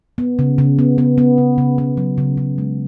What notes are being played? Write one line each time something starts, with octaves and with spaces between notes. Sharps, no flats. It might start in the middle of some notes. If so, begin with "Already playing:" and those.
B3
C#3
C#3
B3
B3
B3
C#3
C#3
B3
F#3
C#3
C#3
G#3